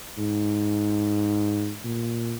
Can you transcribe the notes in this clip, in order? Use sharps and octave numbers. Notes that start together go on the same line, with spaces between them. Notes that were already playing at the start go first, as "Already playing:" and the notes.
G#2
A#2